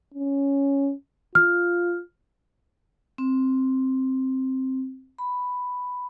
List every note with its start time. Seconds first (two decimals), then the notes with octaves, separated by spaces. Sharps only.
0.14 C#4
1.35 F4 F6
3.18 C4
5.18 B5